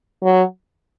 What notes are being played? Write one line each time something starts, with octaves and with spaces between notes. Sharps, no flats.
F#3